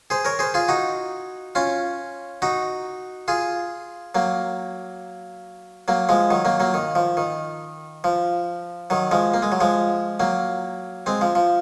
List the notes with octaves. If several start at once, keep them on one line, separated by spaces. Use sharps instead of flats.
G#4 C5
A#4 C#5
G#4 C5
F4 G#4
D#4 F#4
C#4 F4
D#4 F#4
F4 G#4
F#3 A#3
F#3 A#3
F3 G#3
D#3 F#3
F#3 A#3
F#3 A#3
D#3
F3
D#3
F3
D#3 F#3
F3 G#3
A#3
G#3
F#3
F3 G#3
F#3 A#3
G#3 C4
F3
F3